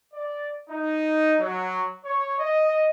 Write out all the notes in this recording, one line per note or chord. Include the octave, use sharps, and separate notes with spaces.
D5
D#4
F#3
C#5
D#5